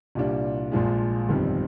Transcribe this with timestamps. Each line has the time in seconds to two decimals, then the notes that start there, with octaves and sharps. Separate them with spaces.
0.15 C2 A#2 G3 D4
0.72 A#1 A#2 F3 G#3
1.29 G1 F2 D#3 G3 C4